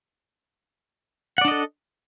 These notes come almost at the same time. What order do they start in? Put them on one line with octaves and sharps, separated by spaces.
F#5 D5 D4 D#5 A4